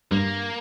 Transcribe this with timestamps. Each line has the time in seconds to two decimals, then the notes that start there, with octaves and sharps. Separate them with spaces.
0.11 G2 A#3